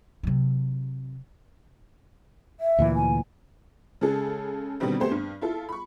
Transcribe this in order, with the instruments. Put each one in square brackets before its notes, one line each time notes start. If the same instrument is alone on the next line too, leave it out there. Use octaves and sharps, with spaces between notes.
[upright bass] C3 F#3
[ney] E5
[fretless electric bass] D2 A#2 E3
[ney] G#5
[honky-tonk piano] C#3 G#3 G#4 A4
B2 D3 D#3 G3 C4
A3 B3 C4 G4 G#4 C5
G2
E4 F4 A4
B5 C#6